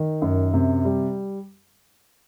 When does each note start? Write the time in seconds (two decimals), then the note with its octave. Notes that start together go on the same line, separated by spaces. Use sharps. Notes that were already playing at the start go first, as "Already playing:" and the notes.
Already playing: D#3
0.22 F#2
0.53 C3
0.85 G3